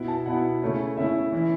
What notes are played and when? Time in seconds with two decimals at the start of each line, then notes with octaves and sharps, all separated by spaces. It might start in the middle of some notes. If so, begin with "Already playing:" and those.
Already playing: B2 B3 E4
0.08 A5
0.26 B2 B3 E4 F#5
0.62 C#3 A3 C#4 E4
0.97 C#3 A3 C#4 E4 E5
1.32 E3 C#4 E4